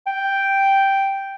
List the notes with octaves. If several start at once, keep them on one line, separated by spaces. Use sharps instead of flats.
G5